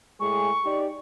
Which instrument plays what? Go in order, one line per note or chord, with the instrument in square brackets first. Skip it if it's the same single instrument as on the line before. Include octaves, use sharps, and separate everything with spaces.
[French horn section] A2 G#3 G#4 [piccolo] C#6
[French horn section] D#4 G4 D5